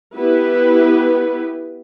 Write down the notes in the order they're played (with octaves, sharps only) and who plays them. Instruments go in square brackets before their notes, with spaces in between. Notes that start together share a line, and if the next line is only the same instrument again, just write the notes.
[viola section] B3 E4 G4 B4